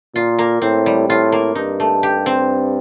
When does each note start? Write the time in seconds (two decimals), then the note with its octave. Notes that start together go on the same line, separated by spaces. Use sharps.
0.15 A#2 F4
0.39 A#3
0.62 A2 C4
0.86 G3
1.09 A2 F4
1.32 A#3
1.55 G2 D#4
1.80 A3
2.03 G4
2.26 C4